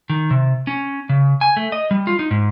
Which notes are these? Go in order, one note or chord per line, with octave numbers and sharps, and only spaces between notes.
D#3
C3
C#4
C#3
G#5
A3
D#5
G3
F4
D#4
G#2